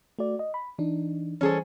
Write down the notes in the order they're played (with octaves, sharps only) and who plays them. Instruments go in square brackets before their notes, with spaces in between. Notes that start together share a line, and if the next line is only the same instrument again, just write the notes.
[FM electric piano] A3 F#4 D5
D#5
B5
E3 D4 D#4
[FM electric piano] E3 G3 C5 [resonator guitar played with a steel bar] C#4 G#4 A4